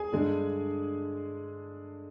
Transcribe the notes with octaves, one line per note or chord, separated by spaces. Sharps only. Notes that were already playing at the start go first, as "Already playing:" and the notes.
Already playing: G#4 G#5
G2 D3 G#3